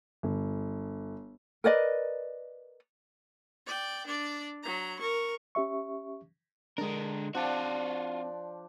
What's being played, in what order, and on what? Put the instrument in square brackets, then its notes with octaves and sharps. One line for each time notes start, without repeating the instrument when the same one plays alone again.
[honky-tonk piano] G1
[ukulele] A#4 B4 D5 D#5
[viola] D5 G5
D4 D5
F#3 A#5
A#4 C#6
[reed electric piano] C#4 G4 E5 C#6
[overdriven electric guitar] D3 A#4 [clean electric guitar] G#3 D4
[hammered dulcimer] F3 D4 [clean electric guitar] C4 [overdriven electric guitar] F4 F#4 [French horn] D5